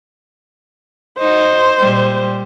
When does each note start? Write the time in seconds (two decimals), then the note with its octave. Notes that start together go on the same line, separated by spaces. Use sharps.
1.19 D#4 F#4 C5
1.79 A#2 G3